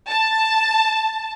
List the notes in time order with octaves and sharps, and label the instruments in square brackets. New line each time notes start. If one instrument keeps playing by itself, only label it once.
[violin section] A5